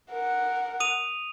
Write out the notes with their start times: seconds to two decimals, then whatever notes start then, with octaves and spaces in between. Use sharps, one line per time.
0.11 A#4 F#5
0.80 D#6 D#7 F7